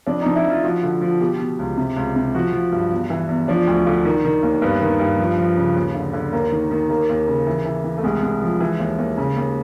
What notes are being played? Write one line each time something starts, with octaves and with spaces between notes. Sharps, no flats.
F2 D4
F2 D#4
E4
F3 F4
F3 F#4
D3
F3
B2 G4
B2
C#2
C3
C#2
C3
F3 F#4
F3
G2
E2
E3
E2
F3 D4
D2
D3
D#3
D#3
D#2
G2 B3
D#3
G2
F3
F3
C#3
D#2
D3
D3
D#2 A#3
D#3
D#3
D#2 A#3
D#2
C#3
E3
E3
E3
A3
C2 G#3
C2
F3
E3
D#2
D#2
C#3
D#2